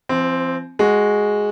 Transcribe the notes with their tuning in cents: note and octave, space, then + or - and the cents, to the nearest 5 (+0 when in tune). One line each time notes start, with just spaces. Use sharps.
F3 -45 C4 +0
G#3 +0 F#4 +0